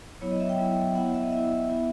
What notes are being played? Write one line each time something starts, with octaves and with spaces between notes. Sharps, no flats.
F#3 B3 E4 C#5
D#5
E5
G5
F#3 B3 E4
B3 E4 F#5
E5
D#5
B3 E4 E5
B3 E4